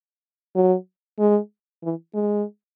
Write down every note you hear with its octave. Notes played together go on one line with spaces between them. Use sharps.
F#3
G#3
E3
G#3